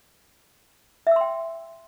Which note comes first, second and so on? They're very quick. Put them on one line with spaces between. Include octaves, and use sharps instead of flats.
E5 E6 C6 G5